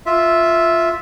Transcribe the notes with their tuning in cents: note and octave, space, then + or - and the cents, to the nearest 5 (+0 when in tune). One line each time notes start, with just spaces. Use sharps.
F4 +0 E5 +0